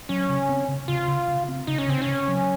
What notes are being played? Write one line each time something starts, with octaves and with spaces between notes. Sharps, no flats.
F#3 C#4
C#3
C4
C#3
C#3 F4
C#3
C#3
C4
C#3 D#4
C#4
C#3 C4
C#4
C#3
F#3